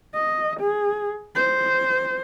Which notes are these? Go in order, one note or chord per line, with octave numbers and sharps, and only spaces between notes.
D#5
G#4
C5